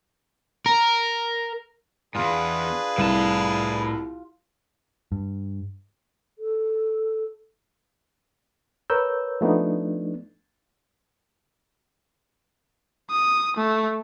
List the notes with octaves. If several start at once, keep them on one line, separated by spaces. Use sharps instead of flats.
A#4
E2 G#2 D4 F4 G#4 B4
C2 A2 A5
G2
A4
A#4 B4 C#5 E6 G6
F3 A3 B3 D4 D#4
D#6
A3